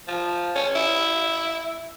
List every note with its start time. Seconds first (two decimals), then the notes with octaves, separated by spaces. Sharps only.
0.08 F3
0.55 C#4
0.75 E4